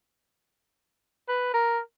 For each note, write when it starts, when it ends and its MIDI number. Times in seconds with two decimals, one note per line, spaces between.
1.28 1.50 71
1.54 1.79 70